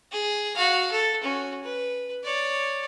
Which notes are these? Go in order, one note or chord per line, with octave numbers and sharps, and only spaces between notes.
G#4
F#4 F5
A4
C#4 F#4
B4
C#5 D5